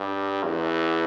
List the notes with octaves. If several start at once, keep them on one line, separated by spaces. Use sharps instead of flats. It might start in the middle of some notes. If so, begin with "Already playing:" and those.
Already playing: G2
E2